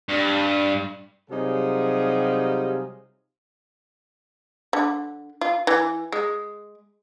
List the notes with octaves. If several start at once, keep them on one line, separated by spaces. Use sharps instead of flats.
G2
C3 F#3 G3 D#4 F4 G#4
D3
F4
E3
G#3